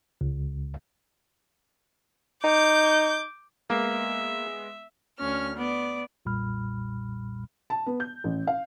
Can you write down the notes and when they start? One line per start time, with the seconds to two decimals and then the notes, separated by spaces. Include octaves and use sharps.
0.21 C#2
2.44 D#4 D6 G6
3.70 G#3 A#3 B3 E5
5.19 D2 C#4 F6
5.56 B3 D5
6.25 B1 F2 A#2 G3 B5 F6
7.70 A5
7.86 B3
8.00 G6
8.24 A1
8.47 F5